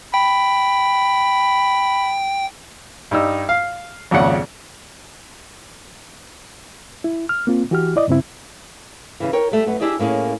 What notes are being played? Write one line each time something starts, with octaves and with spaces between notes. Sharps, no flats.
G5 B5
G2 G3 D#4 E6
F5
G#1 F2 A#2 C#3 F#5
E4
F6
A#3 C4 F4
E3 F#4 G4 F6
E4 D5 D#5
G2 C#3 C4 E4
C#3 E3
A#4 C#5 G5
G3 A3
F#2 B3
D4 E4 G4 G#4 D5 D#5
A2 A#3 C#4 G#4